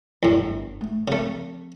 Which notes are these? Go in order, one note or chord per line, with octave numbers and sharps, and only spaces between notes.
G1 E2 A2
A3
C#3 F3 A3 C4